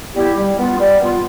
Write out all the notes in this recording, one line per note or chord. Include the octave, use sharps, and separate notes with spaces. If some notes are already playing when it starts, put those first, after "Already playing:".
G3 B3 E4 G4
G3
B3 F4
G3
B3 F4